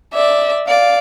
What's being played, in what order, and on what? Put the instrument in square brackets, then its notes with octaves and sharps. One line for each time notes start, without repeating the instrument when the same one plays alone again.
[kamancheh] D5 [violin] E5
[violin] D5 [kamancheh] F5